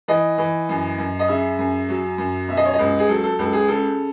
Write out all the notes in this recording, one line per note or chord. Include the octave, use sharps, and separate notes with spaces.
E3 D#5
E3
F#2
F#2
D#5
C#3 E5
F#2
F#3
F#2
B2 E5
D#5
C#5
D#5
C#2
G#4
F#3 A4
A4
C#2 A4
G#4
C#3 A4